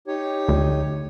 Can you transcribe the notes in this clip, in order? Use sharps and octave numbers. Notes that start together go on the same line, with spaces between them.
D#4 G4 C#5
D2